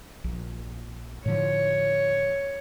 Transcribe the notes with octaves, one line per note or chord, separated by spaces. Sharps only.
A#1
A2 D3 F3 C#5